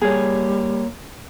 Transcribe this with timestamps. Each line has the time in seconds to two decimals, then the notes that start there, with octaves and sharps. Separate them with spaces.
0.01 G3 A#3 G#4 C#5